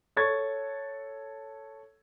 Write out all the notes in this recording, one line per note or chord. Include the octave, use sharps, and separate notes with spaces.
A4 C#5 C#6 G#6 A6